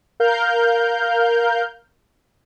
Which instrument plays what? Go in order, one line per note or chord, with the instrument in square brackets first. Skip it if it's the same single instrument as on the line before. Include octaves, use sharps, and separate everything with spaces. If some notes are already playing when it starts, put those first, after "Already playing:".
[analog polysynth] A#4 F5 F6 G6